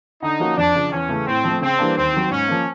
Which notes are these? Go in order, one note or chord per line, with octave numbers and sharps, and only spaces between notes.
D3 D#4
F3 A#3 C#4 F#4
F2 D4
C#3 F3
E2 C#4
C#3 E3 A3
A2 C4
F3 A3
C#3 C4
E3 G3 A#3 D4
D#2 C4
D#3 F#3
G#2 C#4
F3 A#3